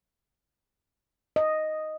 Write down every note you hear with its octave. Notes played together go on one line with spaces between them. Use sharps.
D#5